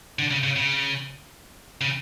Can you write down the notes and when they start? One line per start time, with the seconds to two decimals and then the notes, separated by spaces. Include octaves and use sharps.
0.19 D3
0.31 C#3
0.43 C#3
0.56 C#3
1.81 C#3